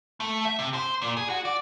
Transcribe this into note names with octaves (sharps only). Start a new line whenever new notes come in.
A3
E5
C3
C5
A#2
G#4
F#4
D5